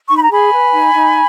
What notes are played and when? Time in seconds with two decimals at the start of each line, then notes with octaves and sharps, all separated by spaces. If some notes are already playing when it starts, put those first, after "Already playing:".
0.09 D#4 C#6
0.17 B5
0.24 A#5
0.30 G#4 G#5 B5
0.52 B4
0.73 D#4
0.94 D#4